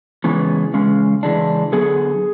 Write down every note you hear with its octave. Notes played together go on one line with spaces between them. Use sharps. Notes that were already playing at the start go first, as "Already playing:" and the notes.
C#3 E3 G#3 B3
E2 C#3 G#3 C#4
E2 C#3 E3 G#3 D4
D3 F#3 B3 G#4